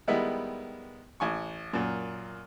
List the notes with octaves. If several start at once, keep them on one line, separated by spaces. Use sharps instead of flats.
D#3 G3 G#3 B3 E4
A1 G#5 C#6
F#2 A#2